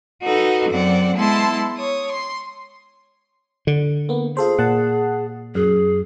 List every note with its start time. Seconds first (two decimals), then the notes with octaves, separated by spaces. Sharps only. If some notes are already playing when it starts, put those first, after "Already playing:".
0.23 D#4 F#4 A4 B4 D#5
0.69 F#2 C4 D5 F#5
1.15 G#3 B3 E4 A5 C6
1.77 C#5 D#6
2.10 C6
3.67 D3
4.09 A#3 B3
4.37 F4 G#4 A4 C5
4.59 A#2 F#5 A5
5.55 F#2 G#4